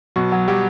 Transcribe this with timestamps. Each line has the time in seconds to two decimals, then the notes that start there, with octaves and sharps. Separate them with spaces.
0.16 B2 F#3 F#4
0.32 F#3
0.48 F#3 G3 G4